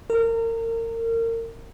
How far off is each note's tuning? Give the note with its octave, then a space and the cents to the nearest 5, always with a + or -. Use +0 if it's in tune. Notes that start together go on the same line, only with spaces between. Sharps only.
A#4 -30